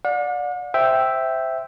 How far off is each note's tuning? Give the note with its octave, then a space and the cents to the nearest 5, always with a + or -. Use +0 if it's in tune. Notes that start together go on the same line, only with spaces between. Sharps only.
D5 +0 F#5 -45
C5 +0 E5 +0 G5 -5